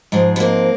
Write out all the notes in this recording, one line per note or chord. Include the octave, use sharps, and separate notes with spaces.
G#2 F3 G#3
B3
A#3 C4